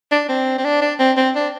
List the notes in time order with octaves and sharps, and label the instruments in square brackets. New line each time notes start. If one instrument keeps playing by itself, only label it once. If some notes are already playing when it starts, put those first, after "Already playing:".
[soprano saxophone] D4
C4
C4
D4
D4
C4
C4
D4